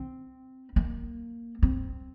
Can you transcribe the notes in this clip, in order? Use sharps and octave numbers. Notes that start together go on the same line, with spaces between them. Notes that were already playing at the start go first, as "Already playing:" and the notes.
Already playing: C4
A#3
C4